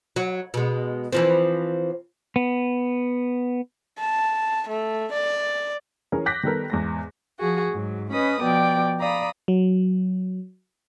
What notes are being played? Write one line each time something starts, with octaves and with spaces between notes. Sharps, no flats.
F#3
B2 G#3
E3 F3 C4
B3
A5
A3
D5
E3 C#4 G#4 A#4 C#5
D6 F#6 G6 A#6 B6
D#3 G3 B3 A4 A#4
E2 G#2 A#6
F3 F#4 G#4
G#2 F#3
C#4 B4 D#5 B5 D#6
B2 F3 D5 G5
D5 F5 A#5 B5 D#6
F#3